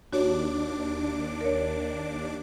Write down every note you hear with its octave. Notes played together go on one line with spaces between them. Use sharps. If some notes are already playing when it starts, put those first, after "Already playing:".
D#2 D4 F#4 C#5 D6
A#4 C#5